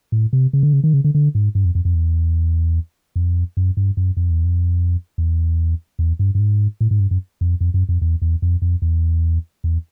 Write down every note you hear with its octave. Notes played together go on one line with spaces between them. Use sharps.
A2
C3
C#3
D3
C#3
D#3
C#3
D3
D3
G#2
G2
F2
F2
F2
E2
F2
F#2
G2
F#2
F2
E2
F2
E2
E2
G2
G2
G#2
A2
G#2
G2
F#2
F2
F2
F#2
F2
E2
E2
F2
F2
E2
E2